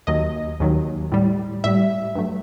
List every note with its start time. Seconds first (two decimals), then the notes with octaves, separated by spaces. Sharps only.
0.07 D#2 D#3 F#3 D#5
0.60 D#2 D#3 F#3
1.12 A2 G3
1.64 A2 G3 E5
2.15 G2 F#3 A3